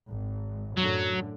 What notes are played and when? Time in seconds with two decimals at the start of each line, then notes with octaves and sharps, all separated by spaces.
0.11 G#1
0.77 F#2 A2 D3 F#3